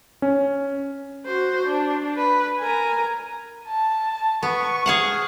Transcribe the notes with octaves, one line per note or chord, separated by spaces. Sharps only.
C#4
F#4 C5
D4
B4
A#4 G#5
A5
B3 C#6
G#4 F5 F#5